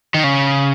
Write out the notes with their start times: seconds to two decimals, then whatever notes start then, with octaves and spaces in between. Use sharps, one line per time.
0.14 D#3
0.24 C#3